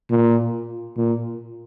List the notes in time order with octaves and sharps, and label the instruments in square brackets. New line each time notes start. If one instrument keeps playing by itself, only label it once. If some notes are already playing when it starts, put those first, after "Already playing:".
[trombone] A#2
A#2